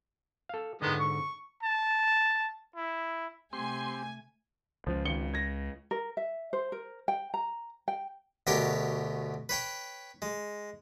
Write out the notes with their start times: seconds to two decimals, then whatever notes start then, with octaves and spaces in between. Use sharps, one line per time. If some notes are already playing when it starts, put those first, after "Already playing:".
0.49 A4 F5
0.82 G#2 D3 D#3 G#3 B3
1.01 C#6
1.63 A5
2.76 E4
3.53 C3 A3 C4 G4 G#5 C6
4.87 C#2 C#3 F3
5.05 G#1 C#7 G7
5.34 G#6 A#6
5.91 A#4
6.17 E5
6.53 C5
6.72 A#4
7.08 G5
7.34 A#5
7.88 G5
8.47 D2 B2 G4 A#4 C#5 G5
9.49 B4 C#5 G5
10.22 G#3